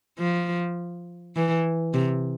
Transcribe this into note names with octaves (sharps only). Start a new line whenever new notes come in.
F3
E3
C3